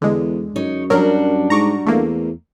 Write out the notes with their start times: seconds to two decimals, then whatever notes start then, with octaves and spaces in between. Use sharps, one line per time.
0.02 E2 D3 G#3
0.56 F#2 D#4 C#5
0.90 F#3 G3 D4 F#4 A#4
1.50 G#2 A#5 C#6 D6
1.86 E2 A3 A#3